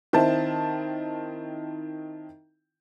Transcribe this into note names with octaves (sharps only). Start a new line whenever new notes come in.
D#3 C4 E4 A5